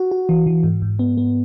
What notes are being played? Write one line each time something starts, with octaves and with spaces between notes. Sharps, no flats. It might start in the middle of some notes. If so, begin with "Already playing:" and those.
Already playing: F#4
F#4
E3
E3
G#2
G#2
B3
B3